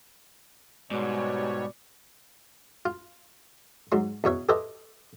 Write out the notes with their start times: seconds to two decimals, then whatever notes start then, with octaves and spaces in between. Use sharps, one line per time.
0.91 G#2 B2 G3 C#5 D5
2.85 F4
3.92 G#2 F#3 C6
4.24 E2 B2 C#5 E5
4.49 G4 A4 B4 C5 D#5 E5